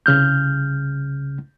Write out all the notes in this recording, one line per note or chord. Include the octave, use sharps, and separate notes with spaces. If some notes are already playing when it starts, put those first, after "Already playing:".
C2 C#3 F6 G6